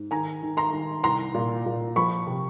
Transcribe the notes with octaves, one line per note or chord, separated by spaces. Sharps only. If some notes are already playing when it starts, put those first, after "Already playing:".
Already playing: G#2
D#3 G#5 A#5
D#3
A#5 C6
D#3
C2 A#5 C6
A#2
A#2
F3 B5 C#6
C3